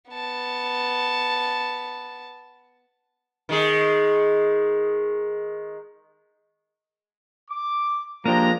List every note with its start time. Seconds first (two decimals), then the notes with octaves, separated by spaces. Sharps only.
0.10 B3 A5
3.49 D#3 G#3 G#4
7.50 D6
8.25 F3 G#3 A#3 D4 G4 A#5